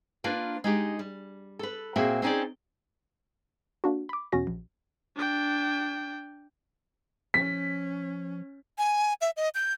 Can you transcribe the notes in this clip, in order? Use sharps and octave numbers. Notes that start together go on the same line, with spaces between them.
A#3 D4 F4 A#4 B4
G#3 D#4 G4
G3
A4 B4
A#2 A#3 C4 F#4 G#4 E5
C4 C#4 D#4 G4 G#4 D5
A#3 D4 F#4
B5 D6
E2 B2 C#4 F#4 A#6
A#1
D4 G5
F3 C#4 B6
G#5
E5
D#5
G6